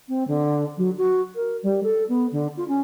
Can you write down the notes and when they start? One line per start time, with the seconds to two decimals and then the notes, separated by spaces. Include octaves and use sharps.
0.08 C4
0.27 D3
0.77 F#3
0.97 F#4
1.35 A#4
1.62 G3
1.83 A4
2.08 B3
2.31 D3
2.56 F4
2.68 C#4